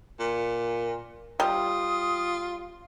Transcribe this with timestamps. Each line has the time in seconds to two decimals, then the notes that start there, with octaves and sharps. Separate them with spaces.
0.20 A#2
1.40 G3 F4 D#6